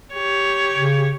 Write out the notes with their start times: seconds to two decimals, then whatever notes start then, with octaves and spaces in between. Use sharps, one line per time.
0.13 G4 C#5
0.75 C#3